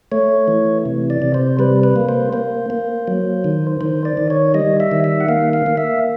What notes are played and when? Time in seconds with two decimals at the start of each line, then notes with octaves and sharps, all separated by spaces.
0.12 A3 C#5
0.48 E3
0.86 C3
1.10 D5
1.22 C3
1.34 C5
1.59 G3 B4
1.83 B4
1.96 A#3
2.09 C5
2.33 A#3 C5
2.70 A#3
3.07 F#3
3.44 D#3
3.81 D#3 C5
4.05 D5
4.17 D#3
4.30 C#5
4.54 G3 D#5
4.80 E5
4.91 D#3
5.04 E5
5.20 F#5
5.29 A#3 F5
5.53 F5
5.66 A#3
5.77 E5